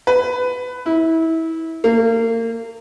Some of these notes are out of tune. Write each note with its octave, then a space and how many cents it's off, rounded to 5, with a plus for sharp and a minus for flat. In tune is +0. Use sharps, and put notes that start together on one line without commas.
B4 +15
E4 -25
A#3 -35